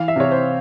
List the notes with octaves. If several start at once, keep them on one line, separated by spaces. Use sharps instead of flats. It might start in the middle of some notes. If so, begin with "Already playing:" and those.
Already playing: E3 F5
E5
C3 C#5
C5